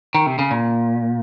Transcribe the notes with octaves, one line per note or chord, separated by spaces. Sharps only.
D#3
C3
C#3
A#2